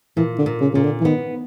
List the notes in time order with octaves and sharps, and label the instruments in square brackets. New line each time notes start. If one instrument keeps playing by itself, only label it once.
[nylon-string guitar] A#2 [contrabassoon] E3
[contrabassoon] D3
[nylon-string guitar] A#2
[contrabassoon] C#3
[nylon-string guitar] A#2 [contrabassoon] C#3
[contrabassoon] D3
E3
[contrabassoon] D#3 [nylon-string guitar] B3